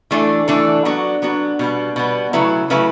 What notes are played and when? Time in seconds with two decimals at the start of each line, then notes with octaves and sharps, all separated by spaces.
0.11 E3 A3 D4 A4
0.48 E3 A3 D4 A4
0.85 F#3 B3 D4 F#4
1.22 F#3 B3 D4 F#4
1.59 B2 G3 B3
1.96 B2 G3 B3
2.33 C#3 F#3 A3 E4 B4
2.70 C#3 F#3 A3 E4 B4